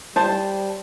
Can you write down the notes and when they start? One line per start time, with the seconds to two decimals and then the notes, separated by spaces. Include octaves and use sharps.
0.16 G3 C5 A5